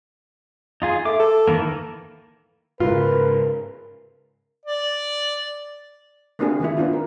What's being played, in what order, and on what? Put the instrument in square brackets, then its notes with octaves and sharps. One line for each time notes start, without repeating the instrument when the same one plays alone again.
[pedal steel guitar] D#4 F4 G#4
[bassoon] A3 [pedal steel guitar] D6
[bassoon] A4
[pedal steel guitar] D#3 E3 A#3
[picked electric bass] G#2 C#3 G#3 [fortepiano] F4 [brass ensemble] A#4 [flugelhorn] B4
[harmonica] D5
[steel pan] A3 A#3 C4 D4 F#4 G#4
D#3 G#3 D#4 E4
B3 D4 D#4 F4
A#4